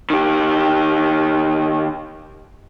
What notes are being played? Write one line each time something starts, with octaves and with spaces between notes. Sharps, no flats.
D#3 G4